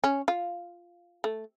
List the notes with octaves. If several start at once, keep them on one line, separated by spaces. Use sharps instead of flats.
C#4
F4
A3